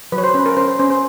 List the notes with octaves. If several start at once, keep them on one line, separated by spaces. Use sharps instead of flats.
F#3 B4
C#5
C5
C#4 B4
A#4
C#4 C5
C5
C#4 C5
C5